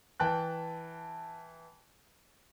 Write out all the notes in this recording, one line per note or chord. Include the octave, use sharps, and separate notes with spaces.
E3 G5 A5 F#6